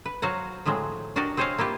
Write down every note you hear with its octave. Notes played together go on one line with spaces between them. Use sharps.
B4
F#3 F#4 C5 F5 F#5 A#5
A2 F3 F#3 G#3 C4
D4 F#4 G4 A#4 D5 D#5
C4 G#4 C5 C#5 D#5 F5
A#3 E4 F4 G4